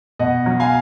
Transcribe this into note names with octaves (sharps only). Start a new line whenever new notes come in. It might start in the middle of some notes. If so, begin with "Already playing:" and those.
B2 D#5 F#5
F#3
F5 G#5